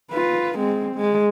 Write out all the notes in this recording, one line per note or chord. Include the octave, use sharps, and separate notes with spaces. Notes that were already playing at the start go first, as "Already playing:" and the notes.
F4 B4
G#3 C4
G#3